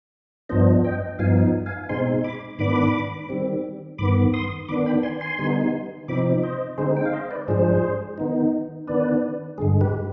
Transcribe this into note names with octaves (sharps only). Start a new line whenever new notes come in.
G2 F3 B3 D4 C5 D#5
D#5 G5
G2 F3 B3 D#4 F5 G#5
F5 G#5
B2 G#3 C4 D#4 G#5 C6
B5 D6
G#2 D#3 B3 D4 B5 D6
D#3 G3 C4
G2 D#3 B3 B5 D6
C6 D#6
D#3 B3 D4 B5 D6
G5 B5
G#5 C6
G#5 C6
D3 G3 B3 D#4
C3 F3 C4 D#4 B5 D6
C5 D#5
D3 G#3 C4 D#4 G#4 C5
G5
F5
C5 D#5
B4 D5
G#2 F3 G#3 D4 G#4 C5
D#3 B3 D#4
D#3 B3 D4 B4 D5
G2 D3 G#3 G#4
G4 B4